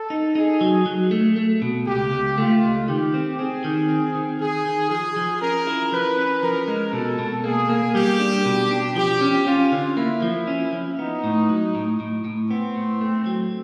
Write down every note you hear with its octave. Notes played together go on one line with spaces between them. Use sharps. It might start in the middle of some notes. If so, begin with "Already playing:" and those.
Already playing: A4
D#4
D#4 G#4
F#3
F#3
A3
A3
B2
C#2 G4
C#2
A3 F4
C#2
D#3 G4
C4
C4 G#4
D#3
C4
D#3
D#3 G#4
D#3
F3 G#4
F3
C#4 A#4
E4
F3 B4
C#4
F3 A#4
G#3
B2 A4
B2
A#3 G#4
A#3
G3 G4
D4
B2
D4
F3 G4
C#4
C#4 F4
D3
A#3 E4
F3
C#4
F3
B3 D#4
A2
F#3
A2
A2
A2
B3 C4
A2
A3
F#3